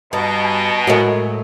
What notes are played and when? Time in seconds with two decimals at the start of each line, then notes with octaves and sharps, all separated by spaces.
0.13 G2 B2 D#5 A5 A#5
0.45 G#5
0.87 A2 F#3 G#3 F#4 A#4